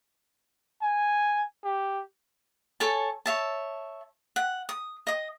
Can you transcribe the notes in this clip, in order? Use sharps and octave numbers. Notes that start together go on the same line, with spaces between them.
G#5
G4
A4 C#5 G#5 A5
C#5 E5 A5
F#5
D#6
D#5 D#6